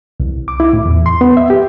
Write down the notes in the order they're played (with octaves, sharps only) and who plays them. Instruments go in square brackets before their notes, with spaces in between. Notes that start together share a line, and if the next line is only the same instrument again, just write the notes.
[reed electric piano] C2
D6
E4
A2
E2
C6
B3
E5
G4